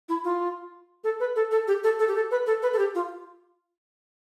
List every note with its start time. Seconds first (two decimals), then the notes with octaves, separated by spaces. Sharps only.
0.09 E4
0.24 F4
1.04 A4
1.20 B4
1.36 A4
1.51 A4
1.68 G4
1.84 A4
1.99 A4
2.08 G4
2.15 A4
2.31 B4
2.47 A4
2.62 B4
2.73 A4
2.79 G4
2.95 F4